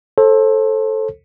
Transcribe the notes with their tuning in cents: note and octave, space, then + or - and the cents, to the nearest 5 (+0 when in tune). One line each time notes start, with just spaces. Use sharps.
A4 +0 C5 +35